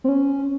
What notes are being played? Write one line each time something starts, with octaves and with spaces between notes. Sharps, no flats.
C4
C#4